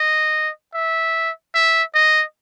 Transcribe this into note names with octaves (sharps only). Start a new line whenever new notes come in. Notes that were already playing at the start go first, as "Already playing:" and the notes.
Already playing: D#5
E5
E5
D#5